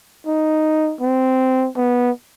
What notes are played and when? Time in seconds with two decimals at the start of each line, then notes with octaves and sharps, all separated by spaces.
0.27 D#4
1.01 C4
1.77 B3